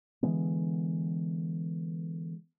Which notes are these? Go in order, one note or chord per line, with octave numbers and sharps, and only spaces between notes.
D3 E3 G#3 B3